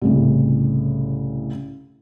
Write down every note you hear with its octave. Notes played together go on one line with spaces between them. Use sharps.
C2 A2 C#3